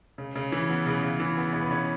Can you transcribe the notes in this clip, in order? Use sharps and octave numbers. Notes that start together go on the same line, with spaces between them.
C#3
C#3
E3
B3
C#3
C#3
E3
B3
C#3 C#5
B4
C#3 C#4 C#5